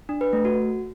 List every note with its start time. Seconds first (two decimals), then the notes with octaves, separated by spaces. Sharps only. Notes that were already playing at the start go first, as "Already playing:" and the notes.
0.09 D4
0.21 B4
0.33 A3
0.45 F#4